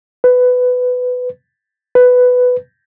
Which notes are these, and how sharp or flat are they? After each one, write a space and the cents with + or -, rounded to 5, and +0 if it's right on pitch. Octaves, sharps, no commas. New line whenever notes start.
B4 +15
B4 +10